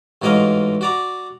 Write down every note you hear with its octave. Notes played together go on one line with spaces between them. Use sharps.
A1 G#2 F#4 A#4 D#5 F5
F#4 D5 A#5